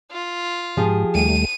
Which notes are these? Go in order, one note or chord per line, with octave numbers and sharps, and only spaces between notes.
F4
G#2 F3 G4 G#4
D#2 G3 A3 D#7